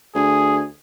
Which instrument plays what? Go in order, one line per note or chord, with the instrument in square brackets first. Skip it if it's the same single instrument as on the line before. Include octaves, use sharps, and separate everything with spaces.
[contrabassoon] D2 [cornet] G#4